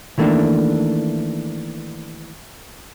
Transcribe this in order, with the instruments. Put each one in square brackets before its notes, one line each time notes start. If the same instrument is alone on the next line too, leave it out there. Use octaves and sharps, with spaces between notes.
[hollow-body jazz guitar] D#3 E3 A3 A#3 D4